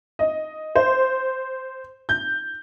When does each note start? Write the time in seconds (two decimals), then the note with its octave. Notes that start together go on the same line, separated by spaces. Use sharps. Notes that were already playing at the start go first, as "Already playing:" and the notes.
0.19 D#5
0.75 C5
2.09 G6